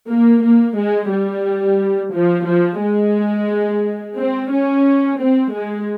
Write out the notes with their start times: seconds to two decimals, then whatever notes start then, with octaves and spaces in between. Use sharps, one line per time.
0.08 A#3
0.43 A#3
0.76 G#3
1.10 G3
2.14 F3
2.47 F3
2.81 G#3
4.17 C4
4.51 C#4
5.19 C4
5.53 G#3